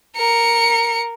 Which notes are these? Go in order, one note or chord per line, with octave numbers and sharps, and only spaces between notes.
A#4 C#7